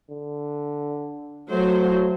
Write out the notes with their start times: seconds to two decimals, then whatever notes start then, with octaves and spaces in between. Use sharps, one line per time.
0.11 D3
1.50 F#3 A3 C5